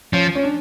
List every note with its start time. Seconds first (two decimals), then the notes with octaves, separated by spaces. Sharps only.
0.13 F3 C#4
0.35 C#4
0.43 D4